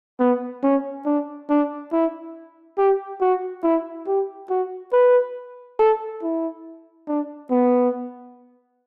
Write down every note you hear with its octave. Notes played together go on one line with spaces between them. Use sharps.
B3
C#4
D4
D4
E4
G4
F#4
E4
G4
F#4
B4
A4
E4
D4
B3